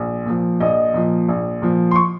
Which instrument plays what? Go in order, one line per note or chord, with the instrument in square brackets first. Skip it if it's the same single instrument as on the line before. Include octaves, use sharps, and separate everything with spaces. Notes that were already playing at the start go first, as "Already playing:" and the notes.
Already playing: [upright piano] A#1
A#2 F3
A#1 D#5
A#2 F3
A#1
A#2 F3
C6
C#6